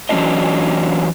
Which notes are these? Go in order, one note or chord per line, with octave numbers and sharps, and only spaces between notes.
E3 F#3 A3 C#4 D4 D#5